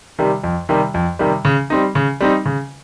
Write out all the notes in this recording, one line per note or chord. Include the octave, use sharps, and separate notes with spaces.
C3 D#3 G3
F2
C3 D#3 G3
F2
C3 D#3 G3
C#3
G3 C4 D#4
C#3
G3 C4 D#4
C#3